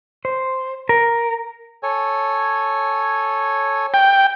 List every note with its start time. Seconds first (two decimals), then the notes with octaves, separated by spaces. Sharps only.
0.25 C5
0.89 A#4
1.83 A4 C#5 G#5
3.94 G5